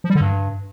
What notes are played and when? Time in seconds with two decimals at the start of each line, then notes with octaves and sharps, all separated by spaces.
0.04 F3
0.10 G3
0.15 D3
0.21 G2